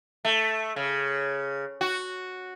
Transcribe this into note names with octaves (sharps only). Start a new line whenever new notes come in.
A3
C#3
F#4